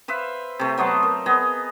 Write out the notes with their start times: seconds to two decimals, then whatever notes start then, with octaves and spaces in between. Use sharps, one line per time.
0.08 B4 C5 E5 F5
0.59 C3 A3
0.78 F#3 B3 C5 A5
1.03 A#4
1.26 B3 G#4 D#5